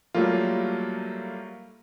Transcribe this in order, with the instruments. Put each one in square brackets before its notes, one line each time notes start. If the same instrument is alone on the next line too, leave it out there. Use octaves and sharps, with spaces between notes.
[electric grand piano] F#3 G3 A3 A#3 F4